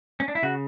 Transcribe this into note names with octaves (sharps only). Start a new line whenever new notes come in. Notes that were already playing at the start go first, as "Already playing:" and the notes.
C#4
D4
E4
C#3 F#4